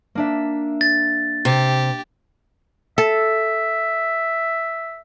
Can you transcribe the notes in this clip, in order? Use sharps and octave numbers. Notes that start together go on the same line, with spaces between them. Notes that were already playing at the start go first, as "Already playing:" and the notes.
A#3 D4 E5
A6
C3 G4
A4 E5